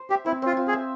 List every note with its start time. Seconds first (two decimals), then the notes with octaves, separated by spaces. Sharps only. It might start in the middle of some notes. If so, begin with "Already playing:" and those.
Already playing: C5
0.10 G4 E5
0.26 C4 E4
0.42 C4 F4
0.57 F4
0.68 G#4
0.73 E5